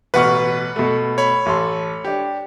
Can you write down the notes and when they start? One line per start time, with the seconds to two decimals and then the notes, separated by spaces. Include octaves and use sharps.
0.14 A1 B2 B4 F#5 C#6 F6
0.76 B2 A3
1.18 C#5 B5
1.46 A1 A4 C6
2.05 D4 G4